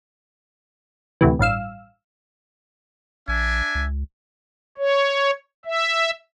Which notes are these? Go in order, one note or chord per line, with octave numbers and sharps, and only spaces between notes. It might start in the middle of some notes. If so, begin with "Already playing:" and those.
D2 A2 C3 E3
A1 G2 F5 E6
A#1 D4 E5 G#5
C#2
C#5
E5